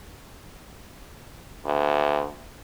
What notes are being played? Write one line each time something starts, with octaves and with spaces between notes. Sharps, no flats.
D2